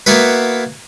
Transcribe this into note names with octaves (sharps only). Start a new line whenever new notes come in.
A#3 B3 E4 F#4 B4